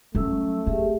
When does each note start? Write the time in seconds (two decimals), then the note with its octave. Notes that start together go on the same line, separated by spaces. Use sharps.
0.15 F#3 G3 A3 C#4 E6
0.66 C4 G4 G#4 E5